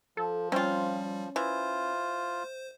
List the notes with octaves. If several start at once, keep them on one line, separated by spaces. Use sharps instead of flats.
F3 A4
G3 C4 C#4 F4
E3 F4 C5